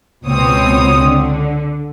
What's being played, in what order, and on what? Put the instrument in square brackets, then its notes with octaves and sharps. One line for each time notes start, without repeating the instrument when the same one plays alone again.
[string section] C#2 B2 C4 C#5 D#6
D3